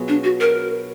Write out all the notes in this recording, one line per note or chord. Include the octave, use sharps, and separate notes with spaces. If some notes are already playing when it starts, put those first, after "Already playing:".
Already playing: B2 F#3 B3 F4 G#4
D4
F#4
A#4